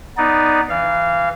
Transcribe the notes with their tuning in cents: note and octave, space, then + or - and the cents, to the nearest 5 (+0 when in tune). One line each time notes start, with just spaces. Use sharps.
B3 +0 D#4 +0 D5 +0
E3 +5 F5 -20